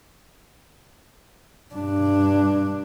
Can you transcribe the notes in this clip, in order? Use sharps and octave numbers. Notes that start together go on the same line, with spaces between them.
G2 D4